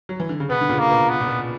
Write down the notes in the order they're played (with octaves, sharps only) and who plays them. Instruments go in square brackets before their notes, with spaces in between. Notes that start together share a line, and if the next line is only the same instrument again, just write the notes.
[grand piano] F#3
E3
D3
C#3
[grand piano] B2 [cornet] B3
[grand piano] D3
A#2 C#3
[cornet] A#3
[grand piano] B2
[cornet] B3
[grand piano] A#2
B2